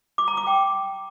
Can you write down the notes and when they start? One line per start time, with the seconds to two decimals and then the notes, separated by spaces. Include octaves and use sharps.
0.18 D6
0.28 A#5
0.37 D6
0.47 G5